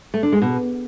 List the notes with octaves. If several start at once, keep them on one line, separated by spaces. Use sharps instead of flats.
A3
D4
G#3
B2